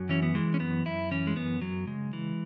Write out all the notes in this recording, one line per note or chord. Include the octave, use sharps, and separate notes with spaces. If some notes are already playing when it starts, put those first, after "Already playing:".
Already playing: F#2 F#3
E3 C#4
B3
E3 G#3
C#4
F#2 B3
F#2 E4
E3 C#4
G#3
F#2 B3
F#2 F#3
C#3 G#3
E3